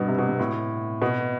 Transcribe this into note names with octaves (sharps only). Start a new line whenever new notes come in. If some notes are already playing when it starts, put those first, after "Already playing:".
Already playing: G2 B2
C3
B2
G2
A2
B2